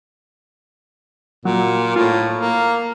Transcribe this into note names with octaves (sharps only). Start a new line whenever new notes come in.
A#2 F#3
A2 F4
A#3